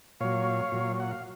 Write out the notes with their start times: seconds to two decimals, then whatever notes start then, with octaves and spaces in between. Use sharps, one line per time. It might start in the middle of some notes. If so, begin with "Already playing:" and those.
0.20 A#2 F#3 C#5 F5
0.72 A#2 F#3
1.00 F#5
1.11 F5